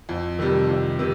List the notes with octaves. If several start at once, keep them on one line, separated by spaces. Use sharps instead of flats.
F2
C3 D#3 G3
F2
C3